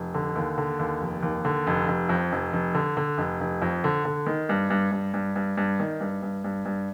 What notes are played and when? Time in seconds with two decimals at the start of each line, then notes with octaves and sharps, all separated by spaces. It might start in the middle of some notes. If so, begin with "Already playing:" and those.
Already playing: F1
0.14 D3
0.36 D#2
0.58 D3
0.79 D#2
1.01 F1
1.23 D#2
1.45 D3
1.67 F1
1.88 F1
2.09 F2
2.32 F1
2.53 F1
2.74 D3
2.97 D3
3.18 F1
3.41 F1
3.62 F2
3.84 D3
4.05 D3
4.26 D#3
4.49 G2
4.70 G2
4.91 G2
5.14 G2
5.36 G2
5.57 G2
5.79 D#3
6.00 G2
6.22 G2
6.44 G2
6.65 G2